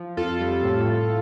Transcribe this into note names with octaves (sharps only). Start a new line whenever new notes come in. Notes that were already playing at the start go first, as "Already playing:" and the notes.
Already playing: F3
F2 F4 A4
G3
A2
A2